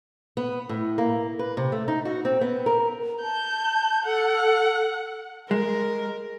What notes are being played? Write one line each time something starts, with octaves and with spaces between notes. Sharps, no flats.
B3
A2
A#3
B4
C3
A3
D#4
F#4
C4
B3
A#4
A5 G6
A4 F#5
G#3 A#4